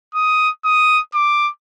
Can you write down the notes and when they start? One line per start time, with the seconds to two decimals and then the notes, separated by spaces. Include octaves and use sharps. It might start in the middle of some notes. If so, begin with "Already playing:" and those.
0.15 D#6
0.65 D#6
1.15 D6